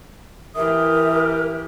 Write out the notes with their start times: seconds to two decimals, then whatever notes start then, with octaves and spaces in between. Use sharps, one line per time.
0.55 E3 G4 A#4 E5 D#6